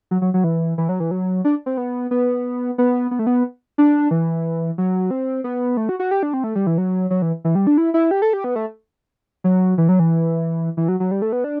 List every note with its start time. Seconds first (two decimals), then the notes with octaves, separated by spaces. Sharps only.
0.11 F#3
0.22 F#3
0.34 F#3
0.44 E3
0.78 E3
0.89 F#3
1.00 E3
1.11 F#3
1.45 D4
1.66 C4
1.77 B3
2.11 B3
2.78 B3
3.11 B3
3.19 A3
3.27 B3
3.78 D4
4.11 E3
4.78 F#3
5.11 C4
5.44 B3
5.77 A3
5.89 F#4
5.99 F#4
6.11 G4
6.23 D4
6.34 C4
6.44 A3
6.55 G3
6.67 E3
6.78 F#3
7.10 F#3
7.22 E3
7.45 E3
7.55 G3
7.67 D4
7.78 E4
7.94 E4
8.11 G4
8.22 A4
8.33 G4
8.44 B3
8.56 A3
9.44 F#3
9.78 E3
9.89 F#3
9.99 E3
10.77 E3
10.88 F#3
11.00 F#3
11.11 G3
11.22 A3
11.32 B3
11.44 D4